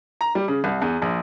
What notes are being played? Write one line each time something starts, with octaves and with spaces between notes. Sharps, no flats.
A#5
G3
C#3
C2
E2
A#1